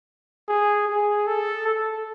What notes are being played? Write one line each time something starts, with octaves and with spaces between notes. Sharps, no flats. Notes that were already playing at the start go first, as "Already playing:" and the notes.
G#4
G#4
A4
A4